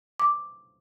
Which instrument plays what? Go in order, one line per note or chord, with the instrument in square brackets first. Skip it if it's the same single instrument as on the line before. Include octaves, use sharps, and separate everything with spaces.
[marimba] D6